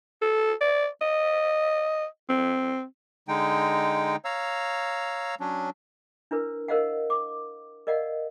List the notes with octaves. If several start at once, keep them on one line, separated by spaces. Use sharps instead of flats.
A4
D5
D#5
C4
D3 G#3 D#4 G5
C#5 F5 A#5 E6
F#3 C#4 D4
D4 E4 A#4 B4
A#4 C5 D#5 F5 F#5
D6
A#4 D5 D#5 F5 F#5